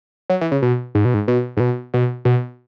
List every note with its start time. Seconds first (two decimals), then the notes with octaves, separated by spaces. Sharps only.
0.30 F#3
0.41 E3
0.52 C#3
0.62 B2
0.95 G#2
1.05 B2
1.14 G#2
1.28 B2
1.57 G#2
1.60 B2
1.94 B2
2.25 B2